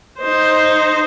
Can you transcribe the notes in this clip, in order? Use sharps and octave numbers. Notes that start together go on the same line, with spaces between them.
D#4 C5